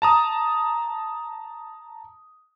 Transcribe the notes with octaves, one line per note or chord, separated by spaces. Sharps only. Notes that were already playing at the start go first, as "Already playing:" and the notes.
A5 A#5 D#6